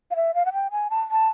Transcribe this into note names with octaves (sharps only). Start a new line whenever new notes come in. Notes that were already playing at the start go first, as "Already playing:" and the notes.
F5
E5
F5
F#5
G5
G#5
A5
A5